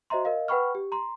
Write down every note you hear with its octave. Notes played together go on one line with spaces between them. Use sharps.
F#4 C5 D#5 E5 A#5 C6
A#4 D#5 F5
B4 F#5 G5 B5 C#6 F6
G4
A#5 C6